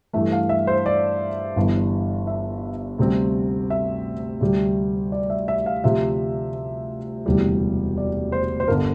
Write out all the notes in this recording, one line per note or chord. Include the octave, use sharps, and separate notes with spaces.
G2 E3 A3 E5
F5
E5
C5
D5
G1 G2 E3
E5
D2 C3 G3 C4
E5
D2 C3 G3
D5
E5
E5
F5
D2 C3 F3 E5
E1 D2 C3 E3 G3
D5
C5
C5
G1 D3 A#4